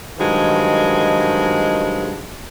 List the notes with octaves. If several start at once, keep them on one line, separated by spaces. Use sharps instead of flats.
G2 D#3 F3 F#3 G#3